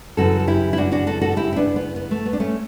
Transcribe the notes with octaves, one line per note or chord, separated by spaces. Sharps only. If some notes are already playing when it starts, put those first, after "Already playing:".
F#2 C#3 E3 F#4 A4
A4
E4 G4
E4
D4 F#4
D4 F#4
F#4 A4
F#4 A4
F#4
E4 G4
E4
B3 D4
B3
B3
A3
B3
D4
A3 C#4